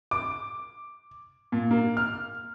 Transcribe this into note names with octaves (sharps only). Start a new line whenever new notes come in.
D6
A#2
A#3
F6